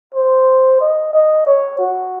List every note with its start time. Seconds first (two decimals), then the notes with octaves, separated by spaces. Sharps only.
0.14 C5
0.81 D#5
1.13 D#5
1.46 C#5
1.79 F#4